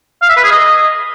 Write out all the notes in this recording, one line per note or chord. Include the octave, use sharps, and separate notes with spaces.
F5
E5
B4
G#4
D#5